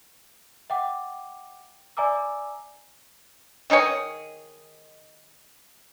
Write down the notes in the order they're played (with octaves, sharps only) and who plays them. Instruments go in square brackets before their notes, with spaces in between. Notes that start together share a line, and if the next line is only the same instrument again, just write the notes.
[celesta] E5 F#5 G5 D6
D5 E5 G#5 A#5 D6 E6
[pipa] D#3 D#4 G#4 C#5